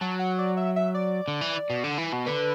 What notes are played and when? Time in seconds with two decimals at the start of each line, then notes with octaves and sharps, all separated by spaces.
0.01 F#3 A5
0.19 F#5
0.38 D5
0.57 E5
0.76 E5
0.94 D5
1.28 D3
1.41 E3
1.70 B2
1.84 D3
1.98 E3
2.13 B2
2.26 D3 B4